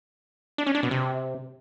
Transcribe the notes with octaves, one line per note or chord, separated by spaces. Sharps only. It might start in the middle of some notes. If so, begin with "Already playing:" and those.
D4
C#4
D4
B2
C3